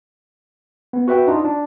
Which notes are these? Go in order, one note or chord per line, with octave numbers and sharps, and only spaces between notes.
B3
F#4 B4 E5 G5
D4 D#4 F4
D4